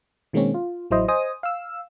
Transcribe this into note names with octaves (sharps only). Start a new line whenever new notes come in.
B2 D#3 G#3 A#3 C4 C#4
F4
A1 F#3 E4 C5 D#5
C5 D#5 G#5 D#6
F5 E6